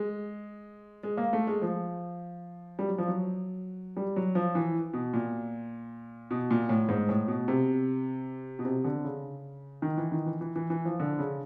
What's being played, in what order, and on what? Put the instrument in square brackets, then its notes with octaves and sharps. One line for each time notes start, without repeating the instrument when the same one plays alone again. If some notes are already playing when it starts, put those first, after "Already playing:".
Already playing: [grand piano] G#3
G#3
A#3
A3
G#3
F3
G3
F#3
F3
F#3
G3
F#3
F3
E3
B2
A#2
B2
A#2
A2
G#2
A2
B2
C3
B2
C3
D3
C#3
D#3
E3
D#3
E3
E3
E3
E3
F3
D3
C#3